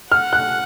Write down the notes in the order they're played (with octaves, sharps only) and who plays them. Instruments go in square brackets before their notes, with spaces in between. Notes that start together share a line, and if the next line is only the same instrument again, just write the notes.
[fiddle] F#5 [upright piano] F6
[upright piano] F#6